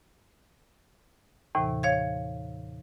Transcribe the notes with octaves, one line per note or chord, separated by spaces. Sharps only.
D#2 A2 C3 E3
C#5 F5 G#6